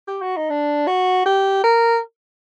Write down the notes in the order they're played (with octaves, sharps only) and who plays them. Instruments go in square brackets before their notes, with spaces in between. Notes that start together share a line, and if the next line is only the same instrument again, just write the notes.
[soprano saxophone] G4
F#4
D#4
D4
F#4
G4
A#4